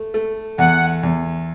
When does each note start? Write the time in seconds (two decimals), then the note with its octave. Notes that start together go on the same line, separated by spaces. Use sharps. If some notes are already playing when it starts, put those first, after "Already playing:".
Already playing: A3
0.14 A3
0.58 E2 F#5
1.03 E2